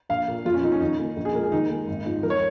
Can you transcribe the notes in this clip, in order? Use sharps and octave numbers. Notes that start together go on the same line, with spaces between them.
A#1 F5
A#2 A#3
F2 F4
C#4
F3 A#3 D#4
C#4
D#2 D#4
D#3 A#3
A#1
G#4
A#2 F3 G#3 A#4
G#4
D#2 D#4
D#3 G#3
G#1
G#2 F3 G#3
F2 A#4
C#5